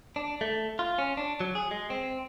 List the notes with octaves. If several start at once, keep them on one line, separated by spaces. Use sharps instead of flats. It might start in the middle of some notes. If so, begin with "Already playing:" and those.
D4
A3
F4
C#4
D4
F#3
G#4
G#3
C4